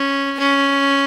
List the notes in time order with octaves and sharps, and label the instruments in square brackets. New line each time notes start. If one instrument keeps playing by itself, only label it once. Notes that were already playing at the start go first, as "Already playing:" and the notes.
Already playing: [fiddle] C#4
C#4